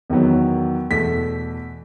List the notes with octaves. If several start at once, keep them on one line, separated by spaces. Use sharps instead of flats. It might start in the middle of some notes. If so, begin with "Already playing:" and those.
E2 D#3 F#3 B3
E2 B2 A3 B6